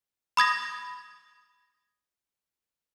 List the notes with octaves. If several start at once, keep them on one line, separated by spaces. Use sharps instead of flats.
B5 D#6 G#6 A#6